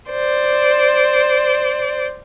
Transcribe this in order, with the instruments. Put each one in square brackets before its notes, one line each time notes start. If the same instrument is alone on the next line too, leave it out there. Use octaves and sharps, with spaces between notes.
[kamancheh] C5 D5